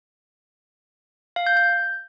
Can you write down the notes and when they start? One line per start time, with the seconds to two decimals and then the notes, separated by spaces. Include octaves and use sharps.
1.36 F5
1.46 G6
1.57 G6